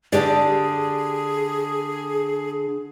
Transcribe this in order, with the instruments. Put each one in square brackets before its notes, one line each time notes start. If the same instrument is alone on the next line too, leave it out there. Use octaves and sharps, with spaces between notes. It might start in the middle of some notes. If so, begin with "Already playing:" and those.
[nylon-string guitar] D3 G4 D5 [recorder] G#4